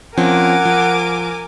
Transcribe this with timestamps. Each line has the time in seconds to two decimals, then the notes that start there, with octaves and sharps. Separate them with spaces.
0.18 F3 C4 C#4 A#4 F#5 G#5 D6
0.65 F3